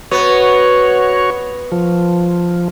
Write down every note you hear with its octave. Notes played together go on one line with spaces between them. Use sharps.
B3 F#4 C#5
F3